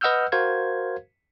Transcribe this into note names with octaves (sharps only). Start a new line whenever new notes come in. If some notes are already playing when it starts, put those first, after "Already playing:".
B4 D#5 F#5 E6 F6 G6
F#4 A#4 C5 F5 G#6